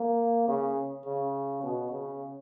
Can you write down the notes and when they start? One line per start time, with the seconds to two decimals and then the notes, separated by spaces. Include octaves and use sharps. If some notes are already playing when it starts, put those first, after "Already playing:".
Already playing: A#3
0.48 C#3
1.05 C#3
1.63 B2
1.91 C#3